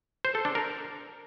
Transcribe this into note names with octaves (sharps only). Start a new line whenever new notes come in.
C5
A4
D4
A#4